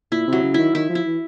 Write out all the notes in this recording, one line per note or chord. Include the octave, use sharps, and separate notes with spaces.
A#2 E4
C3
F#3
C#3
D#3 E4
D#3 E4
F3
E4
E3